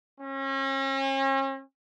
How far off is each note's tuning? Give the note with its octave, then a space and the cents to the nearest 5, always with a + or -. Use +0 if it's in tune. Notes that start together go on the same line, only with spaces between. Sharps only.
C#4 -40